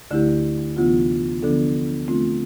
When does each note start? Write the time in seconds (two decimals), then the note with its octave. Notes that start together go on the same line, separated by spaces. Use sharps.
0.11 D2 D3 A3 E4 G4
0.76 D2 C3 E3 B3 F4
1.43 D3 F3 B3 D4 A4
2.08 D3 F3 A3 C4 F4